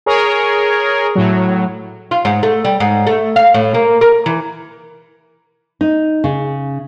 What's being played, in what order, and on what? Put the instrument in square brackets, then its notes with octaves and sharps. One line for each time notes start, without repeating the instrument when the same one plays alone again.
[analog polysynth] G#4 A#4 C#5
A2 F#3
[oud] F4
G#2
A3
G3
G#2
A3
F5
A2
A#3
A#4
E3
[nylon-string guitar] D#4
C#3